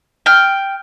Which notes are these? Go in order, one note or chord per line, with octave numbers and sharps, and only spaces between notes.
G5 F6